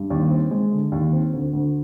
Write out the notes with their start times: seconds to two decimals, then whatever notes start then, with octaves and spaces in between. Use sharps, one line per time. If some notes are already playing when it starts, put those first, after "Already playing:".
Already playing: G2
0.10 D#2
0.31 C4
0.51 G#3
0.72 D3
0.92 D#2
1.13 C4
1.33 D2
1.53 D2